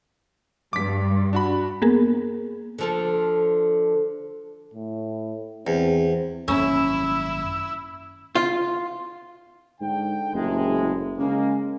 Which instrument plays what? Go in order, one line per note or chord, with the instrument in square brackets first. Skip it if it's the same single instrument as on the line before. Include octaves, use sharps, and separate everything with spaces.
[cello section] G2 [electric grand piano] D6 B6
[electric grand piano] D4 F#4 B5
[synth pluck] A#3 B3 G#4 A#4
[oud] D3 F3 A4
[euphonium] A2
[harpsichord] E2 [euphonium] C4
[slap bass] G#1 F#2 A#3 [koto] C#4 [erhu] E4 [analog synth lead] E6
[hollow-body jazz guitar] F4
[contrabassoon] G#2 [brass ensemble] D3 G5
[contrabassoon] F#1 [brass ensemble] A2 C3 G#3
[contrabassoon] C#3 [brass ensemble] G#3 A#3